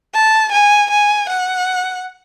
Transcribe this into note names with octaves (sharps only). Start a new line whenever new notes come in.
A5
G#5
G#5
F#5